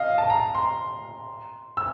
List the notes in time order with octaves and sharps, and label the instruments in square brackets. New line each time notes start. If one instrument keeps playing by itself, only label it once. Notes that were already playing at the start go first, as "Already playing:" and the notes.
Already playing: [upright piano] D#5 F5
A5
A#5
C6
E6